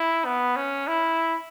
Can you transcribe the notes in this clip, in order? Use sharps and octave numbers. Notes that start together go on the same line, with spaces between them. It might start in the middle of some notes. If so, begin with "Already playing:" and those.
Already playing: E4
B3
C#4
E4